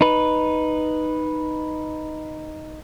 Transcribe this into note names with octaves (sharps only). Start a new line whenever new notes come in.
D#4 B4